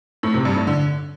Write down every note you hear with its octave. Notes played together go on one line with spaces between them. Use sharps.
A2
C3
G2
A2
D3